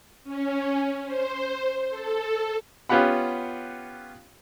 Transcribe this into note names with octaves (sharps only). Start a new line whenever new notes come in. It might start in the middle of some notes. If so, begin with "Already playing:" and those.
C#4
C5
A4
B3 C#4 F4 G4 F#5 B5